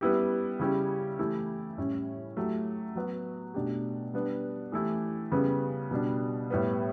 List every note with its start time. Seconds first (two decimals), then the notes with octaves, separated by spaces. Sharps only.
0.01 G3 B3 E4 G4
0.59 C#3 G3 C#4 E4 G4
1.19 E3 A3 E4 G4
1.78 A2 G3 C#4
2.37 F#3 A3 E4 G4
2.96 F#3 B3 F#4
3.54 B2 A3 D4 G4
4.14 G3 B3 D4
4.72 E3 A3 E4 G4
5.32 C#3 G3 B3
5.91 B2 G3 D4
6.50 A2 G3 B3